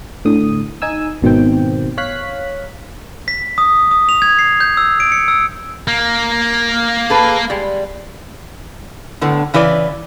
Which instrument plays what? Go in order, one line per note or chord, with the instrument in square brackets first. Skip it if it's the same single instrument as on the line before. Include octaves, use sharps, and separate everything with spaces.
[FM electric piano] A2 D3 D#6
D#4 G#5 E6
G#1 B2 D#3 C4 G5
C#5 F5 F#6 B6
[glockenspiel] B6
D#6
D#6
F7
G#6
C7
G6
E6
D7
C#7
E6
[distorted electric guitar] A#3
[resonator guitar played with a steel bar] G#4 A4 B4
G3 G#3
A2 D3 B3
C#3 E3 B4 D5